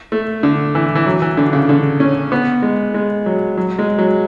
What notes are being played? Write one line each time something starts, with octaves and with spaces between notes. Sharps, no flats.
A3
D3
E3
E3
F#3
E3
D3
C#3
D3
C#4
B3
G#3
G#3
F#3
F#3
G#3
F#3